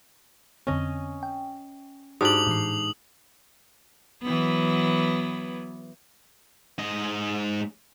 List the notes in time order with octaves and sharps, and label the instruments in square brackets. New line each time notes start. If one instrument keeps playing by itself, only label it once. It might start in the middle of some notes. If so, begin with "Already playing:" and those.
[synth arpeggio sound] F2 D3 C4 [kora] C#4 D#5
[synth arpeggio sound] G5
[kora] G#2 D4 G4 [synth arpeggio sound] F#4 D7 [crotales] D#6 F#7
[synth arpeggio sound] A2 E3 C7
[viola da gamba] E3 F#3 B3
[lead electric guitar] G#2 D#5